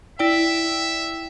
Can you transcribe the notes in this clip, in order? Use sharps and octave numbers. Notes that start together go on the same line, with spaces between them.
E4 D5 E5 G5